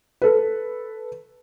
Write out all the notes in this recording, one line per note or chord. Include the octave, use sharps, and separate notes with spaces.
A4 B4